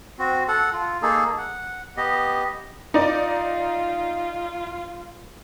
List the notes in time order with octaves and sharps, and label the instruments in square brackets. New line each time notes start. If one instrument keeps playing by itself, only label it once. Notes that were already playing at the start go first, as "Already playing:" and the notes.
[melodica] C4 F#4
A4 F#5
F4
A#3 D#4 G#4 A4
F#5
B3 G4 D#5
[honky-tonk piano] D#4 D5 [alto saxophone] F4